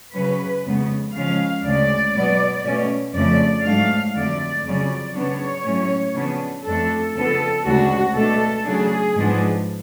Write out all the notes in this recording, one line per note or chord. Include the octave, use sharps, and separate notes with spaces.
C#3 F#3 C#4 B4
F2 C#3 G#3 B3
C#3 F3 G#3 C#4 F5
D2 C#3 G#3 D5
B2 F#3 B3
B2 A3 C#4
F2 C#3 F3 A3 D5
G#2 F#3 A3 D4 F5
F2 D3 F#3 A3 D5
F2 C#3 F#3 C#4 D5
C#3 F#3 B3 D4 C#5
A2 F#3 A3 C#4
C#3 F3 B3 D4
F2 F3 A3 D4 A4
C#3 F3 B3 D4 A4
D2 C#3 G#3 D4 F#4
B2 A3 D4 A4
C#3 F#3 A3 D4 G#4
G#2 F3 G#3 B3 D4